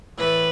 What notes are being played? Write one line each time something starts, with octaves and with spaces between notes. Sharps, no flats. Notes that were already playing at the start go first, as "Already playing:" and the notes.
A2 E3 A3 B4